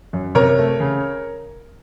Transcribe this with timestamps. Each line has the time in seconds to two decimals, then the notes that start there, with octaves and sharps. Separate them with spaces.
0.13 F#2
0.35 C3 A#4 C#5
0.58 A3
0.80 C#3